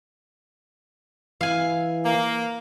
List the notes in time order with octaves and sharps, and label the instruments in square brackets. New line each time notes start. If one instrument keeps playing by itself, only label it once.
[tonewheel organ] E3 [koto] F5 G#5
[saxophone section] A#3